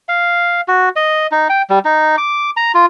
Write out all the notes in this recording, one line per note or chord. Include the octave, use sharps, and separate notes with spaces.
F5
F#4
D#5
D#4
G5
G3
D#4
D6
A#5
F4